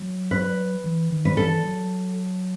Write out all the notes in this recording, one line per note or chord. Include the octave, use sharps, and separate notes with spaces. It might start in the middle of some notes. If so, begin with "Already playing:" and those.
Already playing: F#3
B4
E3
D#3
B4
E3 A4
F#3